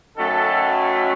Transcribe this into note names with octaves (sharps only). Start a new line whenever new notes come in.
F#2 D#3 F#3 A3 A4